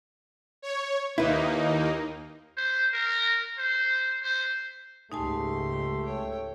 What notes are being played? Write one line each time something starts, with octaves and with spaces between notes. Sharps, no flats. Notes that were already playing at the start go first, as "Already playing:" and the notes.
C#5
D#2 A#3 D#4 E4 B4
C5
A#4
C5
C5
C#2 G#2 A3 D#4 G4 G#5 A5 C6
C#5 G5